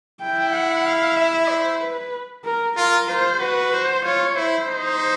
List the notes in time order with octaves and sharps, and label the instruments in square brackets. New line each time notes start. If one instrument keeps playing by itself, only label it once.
[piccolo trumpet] E4 [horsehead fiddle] G5
[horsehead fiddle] F#5
F5
E5
C5
B4
A#4
[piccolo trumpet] F4 [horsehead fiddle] A#4
[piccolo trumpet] F4 [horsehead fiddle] C5
[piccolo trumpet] F#4 [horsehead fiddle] B4
[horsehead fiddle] C5
[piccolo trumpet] F4 [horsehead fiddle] C#5
[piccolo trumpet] E4 [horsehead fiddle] C5
[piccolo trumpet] D#4